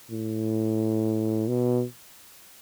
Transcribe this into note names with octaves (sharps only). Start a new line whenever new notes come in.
A2
B2